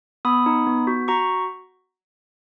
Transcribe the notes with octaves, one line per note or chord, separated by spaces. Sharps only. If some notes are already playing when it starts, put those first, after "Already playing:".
B3 B5 D#6
D#4
B3
F#4
F#4 A#5 C#6